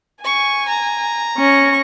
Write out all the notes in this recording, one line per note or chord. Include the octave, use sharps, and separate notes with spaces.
G#5 C#6
A#5
C#4 C#6 A#6